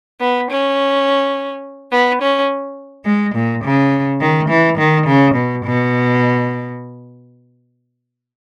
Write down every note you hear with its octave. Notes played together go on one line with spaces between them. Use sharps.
B3
C#4
B3
C#4
G#3
A#2
C#3
D#3
E3
D#3
C#3
B2
B2